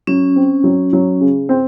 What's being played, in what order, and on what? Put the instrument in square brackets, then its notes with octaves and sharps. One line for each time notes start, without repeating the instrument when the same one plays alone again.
[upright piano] F#3 [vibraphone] C#4
[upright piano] C4
F#3
F#3
C#3
C4